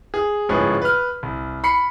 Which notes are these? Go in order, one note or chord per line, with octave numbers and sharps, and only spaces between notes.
G#4
D1 G#2 F3 C#4 G#4 B4
B4 F6
C2
B5 C7 C#7